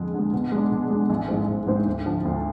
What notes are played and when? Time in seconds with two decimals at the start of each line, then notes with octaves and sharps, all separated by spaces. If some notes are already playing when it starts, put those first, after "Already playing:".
Already playing: F2 D3 G#3
0.14 D3 G#3
0.33 B2
0.52 G#3 D4
0.71 B2
0.90 G#3 D4
1.09 A1
1.28 G#2 G#3 C4
1.48 A1
1.67 G#2 G#3 C4
1.86 D2
2.06 D3 F3
2.25 D2